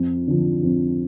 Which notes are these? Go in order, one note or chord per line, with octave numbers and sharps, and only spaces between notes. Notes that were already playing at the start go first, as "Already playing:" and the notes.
Already playing: F2
D3 F3
F2